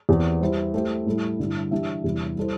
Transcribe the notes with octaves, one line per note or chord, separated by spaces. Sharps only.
E2 E3 C4
G3 E4 C5 E5
A3 E4 G4 C5 E5
A2 G3 E4 A4
G2 D3 G3 E4
E3 G3 D4 G4 E5
E2 C3 G3 E4
G3 E4 A4 C5